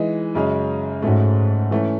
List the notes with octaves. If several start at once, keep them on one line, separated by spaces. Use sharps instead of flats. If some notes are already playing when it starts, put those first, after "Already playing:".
Already playing: E3 G#3 D#4
F#2 C#3 G#3 C#4
G#2 A3 C#4 F#4
E3 A3 C#4